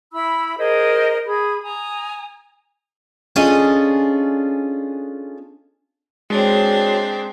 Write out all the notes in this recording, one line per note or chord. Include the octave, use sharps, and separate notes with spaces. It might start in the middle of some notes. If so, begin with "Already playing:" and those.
E4 B5 E6
G#4 A#4 C5 D#5
G#4 B5
G#5 A#5 D#6
C#4 D4 F4 G#4 A4 D#5
G#3 C4 D4 F#4 G#4 C#5